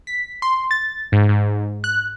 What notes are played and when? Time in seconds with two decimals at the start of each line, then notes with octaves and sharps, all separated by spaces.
0.07 B6
0.42 C6
0.71 A6
1.12 G#2
1.29 G#2
1.84 F#6